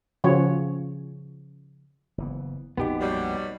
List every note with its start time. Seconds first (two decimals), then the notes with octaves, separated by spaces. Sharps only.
0.24 C#3 F3 F#4 C#5
2.18 F#1 E3 B3
2.77 A#1 F2 A#2 B3 D#4 F#4 G4 D#5
3.00 B2 F#3 G3